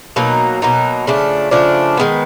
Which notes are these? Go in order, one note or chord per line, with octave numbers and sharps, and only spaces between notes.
B2 F#3 A#3 D#4
B2 F#3 A#3 D#4
C#3 F3 A3 D4
C#3 F3 A3 D4
D#3 G#3 B3